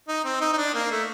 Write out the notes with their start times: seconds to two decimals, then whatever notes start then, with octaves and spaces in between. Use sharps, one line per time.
0.08 D#4
0.25 C4
0.41 D#4
0.53 D#4
0.57 D4
0.74 A#3
0.91 A3